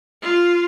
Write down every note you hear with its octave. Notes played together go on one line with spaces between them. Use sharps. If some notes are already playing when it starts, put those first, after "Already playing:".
F4